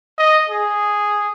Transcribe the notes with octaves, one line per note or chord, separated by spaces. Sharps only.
D#5
G#4